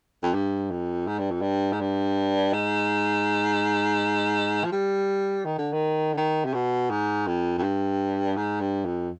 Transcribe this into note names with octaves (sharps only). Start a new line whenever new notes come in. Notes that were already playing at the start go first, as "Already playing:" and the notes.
F2
G2
F2
G#2
G2
F2
G2
G#2
G2
G#2
F3
G3
D#3
D3
D#3
D3
D#3
C3
B2
G#2
F2
F2
G2
G#2
G2
F2